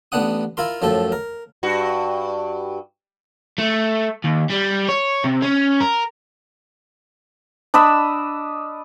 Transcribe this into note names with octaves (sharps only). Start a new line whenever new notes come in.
A1 B3 D4 F#5 D#6
E4 F4 A#4 C6
F#2 A2 F3 A4
A#4
G2 F#4
A3
D#2
G3
C#5
C3
C#4
A#4
D4 D#5 B5 E6